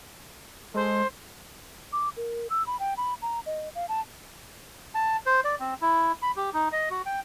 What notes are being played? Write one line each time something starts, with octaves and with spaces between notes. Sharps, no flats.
G#3 A4 C5
D6
A#4
E6
B5
G5
B5
A#5
D#5
F5
A5
A5
C5
D5
C4
E4
B5
G4
D#4
D#5
F#4
G5